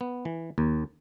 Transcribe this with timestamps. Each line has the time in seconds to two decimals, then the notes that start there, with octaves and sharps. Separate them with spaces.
0.01 B3
0.25 E3
0.58 D#2